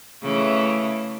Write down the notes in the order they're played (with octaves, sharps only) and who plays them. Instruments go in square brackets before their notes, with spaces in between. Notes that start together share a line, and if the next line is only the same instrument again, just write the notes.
[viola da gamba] C#3 E3 A3